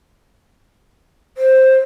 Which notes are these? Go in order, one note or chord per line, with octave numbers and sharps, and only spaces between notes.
C5